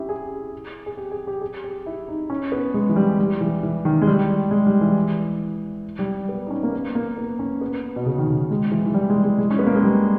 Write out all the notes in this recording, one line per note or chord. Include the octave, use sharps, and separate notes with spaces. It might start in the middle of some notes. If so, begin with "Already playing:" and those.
Already playing: C#4 E4 G4
G#4
G#4
G4
G#4
G4
G#4
G4
E4
D#4
C#4
B3
G#3
E3
G3
G3
E3
E3
D#3
G#3
G3
G#3
G3
E3
G3
B3
D#4
C#4
A#3
B3
A#3
B3
C#4
B3
B2
C#3
D#3
C#3
G#3
E3
E3
G3
G#3
G#3
G#3
C#4
B3
A#3
G#3
G3